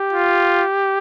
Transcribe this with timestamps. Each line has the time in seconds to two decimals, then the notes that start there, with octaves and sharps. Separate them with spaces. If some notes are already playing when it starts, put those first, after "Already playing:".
Already playing: G4
0.13 F4